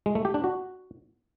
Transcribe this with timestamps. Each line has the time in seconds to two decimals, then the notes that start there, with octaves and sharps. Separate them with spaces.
0.06 G#3
0.15 A3
0.25 G4
0.34 D4
0.44 F#4